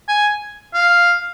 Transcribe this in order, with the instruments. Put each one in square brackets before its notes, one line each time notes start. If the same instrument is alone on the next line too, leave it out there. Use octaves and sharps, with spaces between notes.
[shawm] G#5
F5